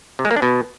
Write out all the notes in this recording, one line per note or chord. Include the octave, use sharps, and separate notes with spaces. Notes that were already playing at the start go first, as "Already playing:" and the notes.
C3
G#3
A#3
D4
B2